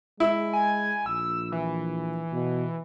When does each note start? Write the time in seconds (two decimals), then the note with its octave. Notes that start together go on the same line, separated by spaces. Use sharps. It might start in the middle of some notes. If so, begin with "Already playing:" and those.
0.20 G#3 E4
0.53 G#5
1.06 A#1 E6
1.52 E3
2.32 B2